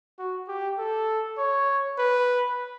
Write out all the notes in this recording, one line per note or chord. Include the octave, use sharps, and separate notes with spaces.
F#4
G4
A4
C#5
B4